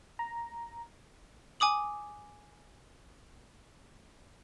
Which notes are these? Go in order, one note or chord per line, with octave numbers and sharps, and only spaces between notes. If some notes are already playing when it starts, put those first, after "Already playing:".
A#5
G#5 D6 D#6 F#7